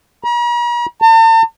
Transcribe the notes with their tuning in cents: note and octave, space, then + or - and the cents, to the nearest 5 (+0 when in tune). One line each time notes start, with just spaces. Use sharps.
A#5 +45
A5 +45